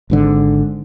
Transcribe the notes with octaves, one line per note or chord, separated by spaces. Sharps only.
G#1 G#2 D3